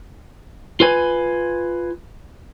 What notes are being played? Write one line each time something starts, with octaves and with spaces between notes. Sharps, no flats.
F4 B4 G#5